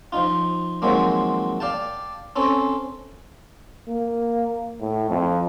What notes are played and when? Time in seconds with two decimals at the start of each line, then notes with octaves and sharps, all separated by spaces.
0.12 F3 D#4 F4
0.82 D#3 F3 F#3 G#3 A#3 C4
1.60 D5 F5 G5 A5
2.36 C4 C#4 A4
3.89 A#3
4.81 A2
5.10 F2